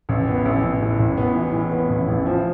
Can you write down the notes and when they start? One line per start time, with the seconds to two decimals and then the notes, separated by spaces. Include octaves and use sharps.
0.09 A1
0.27 B3
0.45 A1
0.63 A1
0.81 A2
0.99 A1
1.17 B3
1.35 E3
1.53 A2
1.72 B3
1.90 A1
2.08 A1
2.26 F3